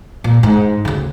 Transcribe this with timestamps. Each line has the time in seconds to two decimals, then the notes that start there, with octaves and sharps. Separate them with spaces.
0.24 A#2
0.43 G#2
0.85 D2 C#3